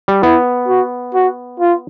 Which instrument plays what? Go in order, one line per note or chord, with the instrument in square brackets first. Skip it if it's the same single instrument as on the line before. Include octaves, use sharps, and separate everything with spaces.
[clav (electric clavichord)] G3
[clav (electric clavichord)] B3 [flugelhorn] E4
[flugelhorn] F#4
F#4
F4